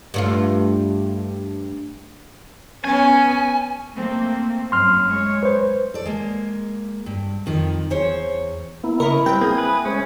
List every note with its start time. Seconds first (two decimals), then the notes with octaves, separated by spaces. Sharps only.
0.14 G2 A3 F4
2.84 B3 C#4 G#5
3.94 A3 A#3 C4
4.72 F#2 C6 F6
5.08 G#3 C#5
5.43 B4 C5
5.94 A4 D5
6.06 G#3 A#3
7.06 G2
7.46 F2 D#3 F3
7.90 E2 C5 C#5
8.84 A#3 B3 E4
9.00 C#3 E4 A#4 D#5 B5 C#6
9.26 G3 C4 A#4 B4 G5
9.41 A#3 G#4 D#6
9.58 B4
9.85 G#3 C#4 C5